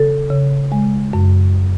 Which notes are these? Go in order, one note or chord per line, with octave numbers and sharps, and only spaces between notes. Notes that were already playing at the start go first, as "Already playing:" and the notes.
Already playing: C#3 A4
C#3
G#3
F#2